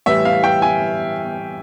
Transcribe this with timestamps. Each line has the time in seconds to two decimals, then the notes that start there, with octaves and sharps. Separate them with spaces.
0.06 A2 E3 G3 E5
0.25 F5
0.44 G5
0.62 G#5